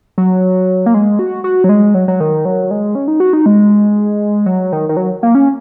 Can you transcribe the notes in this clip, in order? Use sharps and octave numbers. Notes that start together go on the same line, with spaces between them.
F#3
A#3
G#3
F#4
F#4
F#3
G#3
F#3
F#3
D#3
F#3
G#3
C#4
D#4
F#4
D#4
G#3
F#3
D#3
D#3
F#3
A#3
C#4